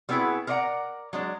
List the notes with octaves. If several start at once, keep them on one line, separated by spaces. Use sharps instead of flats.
G3 B3 C4 E4 F#4 G#4
A#4 C5 D5 D#5 F#5 A#5
F#3 G#3 D4